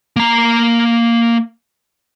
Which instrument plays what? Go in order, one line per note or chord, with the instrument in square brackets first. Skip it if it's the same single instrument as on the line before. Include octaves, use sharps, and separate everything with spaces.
[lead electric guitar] A#3 A#5